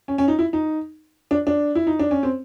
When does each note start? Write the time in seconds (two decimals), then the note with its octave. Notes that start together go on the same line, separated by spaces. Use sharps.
0.08 C#4
0.18 C#4
0.28 D#4
0.39 E4
0.53 D#4
1.31 D4
1.47 D4
1.75 E4
1.87 D#4
1.99 D4
2.11 C#4
2.23 C4